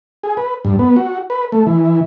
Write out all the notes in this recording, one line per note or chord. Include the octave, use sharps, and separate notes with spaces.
G#4
B4
G2
B3
F#4
B4
A3
E3